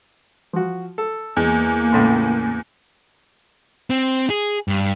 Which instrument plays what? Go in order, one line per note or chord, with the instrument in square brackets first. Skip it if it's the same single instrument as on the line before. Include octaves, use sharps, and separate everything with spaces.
[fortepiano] F3 F#4
A4
[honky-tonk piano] E2 [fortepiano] G#3 [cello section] A#3
[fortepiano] C#2 A2 C6
[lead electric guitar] C4
G#4
G2